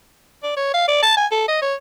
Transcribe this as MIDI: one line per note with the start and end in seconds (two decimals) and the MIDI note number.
0.43 0.53 74
0.57 0.74 73
0.74 0.84 77
0.88 1.02 74
1.03 1.14 81
1.17 1.26 80
1.32 1.46 69
1.48 1.61 75
1.62 1.75 73